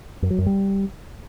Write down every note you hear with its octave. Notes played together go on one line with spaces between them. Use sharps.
F#2
F#3
F#2
G3